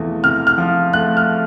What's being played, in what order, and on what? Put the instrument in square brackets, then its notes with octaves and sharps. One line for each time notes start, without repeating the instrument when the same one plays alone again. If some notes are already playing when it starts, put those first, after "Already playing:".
Already playing: [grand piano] E2 C3 F3 A3
C3 F6
F6
F3
A3 F#6
F6